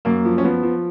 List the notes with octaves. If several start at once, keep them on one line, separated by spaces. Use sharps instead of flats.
F#2 A#3
F3
C#4
F3 B3
F3